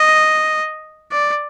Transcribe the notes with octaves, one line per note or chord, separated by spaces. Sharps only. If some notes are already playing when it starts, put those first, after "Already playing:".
Already playing: D#5
D5